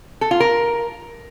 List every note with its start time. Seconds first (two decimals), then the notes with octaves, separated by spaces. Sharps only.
0.21 A4
0.31 F4
0.40 A#4